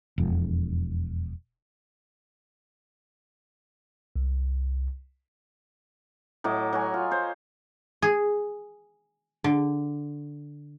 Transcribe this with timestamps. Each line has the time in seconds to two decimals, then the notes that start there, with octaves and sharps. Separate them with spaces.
0.18 E1 F2
4.16 C2
6.44 A2 F#3 D#5 D6
6.73 F#3 F#4 G#5
6.94 F4
7.11 C5 C#5
8.02 G#4
9.44 D3